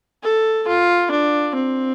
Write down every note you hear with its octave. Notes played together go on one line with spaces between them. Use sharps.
A4
F4
D4
C4